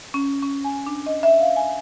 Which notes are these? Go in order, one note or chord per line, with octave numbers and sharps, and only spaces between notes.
C#4
C#4
G#5
D4
D#5
E5
F5
G#5